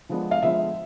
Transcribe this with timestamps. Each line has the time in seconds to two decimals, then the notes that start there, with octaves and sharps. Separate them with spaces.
0.09 D3 F3 G#3 B3 D4
0.31 F5
0.42 D3 F3 G#3 B3 D4 E5